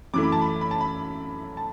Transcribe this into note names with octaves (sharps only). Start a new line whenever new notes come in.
F#2 E3 A3 D6
B5
A5
B5
B5
A5
B5
A5